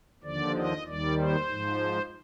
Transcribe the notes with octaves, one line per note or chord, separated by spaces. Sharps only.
D#2 D3 F3 D5
D#5
D#2 D#3 G3 D5
C5
G#2 F3